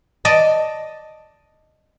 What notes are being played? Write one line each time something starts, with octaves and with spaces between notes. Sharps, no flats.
D5 D#5 A5